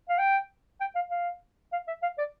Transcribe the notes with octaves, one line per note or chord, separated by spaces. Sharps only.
F5
G5
G5
F5
F5
F5
E5
F5
D5